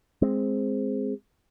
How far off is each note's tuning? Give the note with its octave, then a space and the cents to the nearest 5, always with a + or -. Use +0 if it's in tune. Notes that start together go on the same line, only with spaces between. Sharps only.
G#3 +0 C4 +0